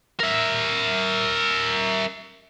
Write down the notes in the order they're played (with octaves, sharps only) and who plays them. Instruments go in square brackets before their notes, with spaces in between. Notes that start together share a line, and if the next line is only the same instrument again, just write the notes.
[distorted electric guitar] A#4 E5